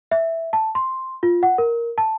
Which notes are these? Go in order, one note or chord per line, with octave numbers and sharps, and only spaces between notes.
E5
A5
C6
F4
F#5
A#4
A5